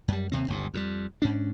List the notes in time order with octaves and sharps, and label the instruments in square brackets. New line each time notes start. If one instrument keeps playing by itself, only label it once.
[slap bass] F#2 G3
D#2 C3 C4
G1 C#2 G2
F2 C3 G3
G#2 C#4 D4